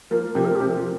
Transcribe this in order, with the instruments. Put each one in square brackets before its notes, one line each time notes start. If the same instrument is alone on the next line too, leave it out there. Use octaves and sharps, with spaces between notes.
[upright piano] F3 A#3 [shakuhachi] A#4
[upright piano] C3 F3 [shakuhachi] G4
[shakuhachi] A#4
G4
[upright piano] C3
F3